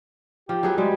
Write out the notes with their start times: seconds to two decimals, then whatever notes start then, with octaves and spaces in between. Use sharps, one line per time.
0.49 F3 G4
0.63 F#3 G#4 B4
0.78 G3 G#3